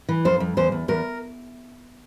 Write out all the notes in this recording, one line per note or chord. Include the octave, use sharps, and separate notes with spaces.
E3
F2 C5
F2
E2 C5
E2
E2 A#4